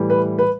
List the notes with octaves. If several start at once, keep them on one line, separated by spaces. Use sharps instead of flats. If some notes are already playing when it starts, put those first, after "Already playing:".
Already playing: A2 E3 G3
B4
B4